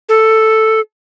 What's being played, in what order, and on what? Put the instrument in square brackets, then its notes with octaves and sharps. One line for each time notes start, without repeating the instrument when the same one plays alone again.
[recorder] A4